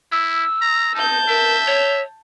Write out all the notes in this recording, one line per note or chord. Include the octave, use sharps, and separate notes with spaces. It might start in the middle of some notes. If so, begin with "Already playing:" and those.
E4 E6
A#5
D#4 A5 G6
A#4 E5
C#5